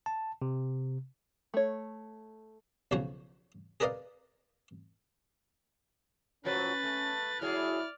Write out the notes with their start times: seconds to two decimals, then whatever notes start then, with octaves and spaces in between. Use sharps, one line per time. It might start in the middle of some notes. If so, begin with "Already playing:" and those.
0.06 A5
0.42 C3
1.54 A3 C#5
2.91 B1 C#3 F3 F#4 C#5
3.80 G#4 A#4 B4 D5 D#5 F5
6.45 A2 F3 F#3 C#4 B4 A6
6.83 A3
7.42 F#3 E4 G#4 D5 F6